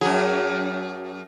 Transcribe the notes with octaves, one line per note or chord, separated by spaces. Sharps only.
F#2 F#3 G#4